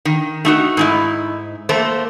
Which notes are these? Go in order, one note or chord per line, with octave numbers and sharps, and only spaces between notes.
D#3
A3 D#4 F#4
G#2 D#4 E4
A3 A#3 C5